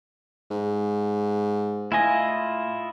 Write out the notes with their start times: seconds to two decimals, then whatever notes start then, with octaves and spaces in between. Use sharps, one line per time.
0.51 G#2
1.92 A2 E4 F4 D#5 G#5